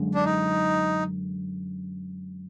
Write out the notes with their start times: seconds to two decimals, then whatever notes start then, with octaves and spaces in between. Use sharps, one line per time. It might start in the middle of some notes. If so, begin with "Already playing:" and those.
Already playing: F#2 D3 G#3
0.15 D4
0.25 D#4